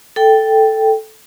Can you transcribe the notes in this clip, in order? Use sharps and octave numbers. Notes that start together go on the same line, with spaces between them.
A4 G5